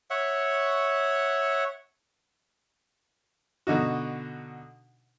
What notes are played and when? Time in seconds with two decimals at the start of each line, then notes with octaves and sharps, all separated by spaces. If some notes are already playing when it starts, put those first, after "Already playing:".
0.10 C#5 E5 F#5
3.67 B2 D3 D#4 F#4